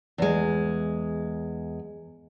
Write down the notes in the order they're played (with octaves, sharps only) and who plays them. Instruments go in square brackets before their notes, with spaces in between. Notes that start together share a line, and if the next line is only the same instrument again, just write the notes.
[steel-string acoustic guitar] E2 G#3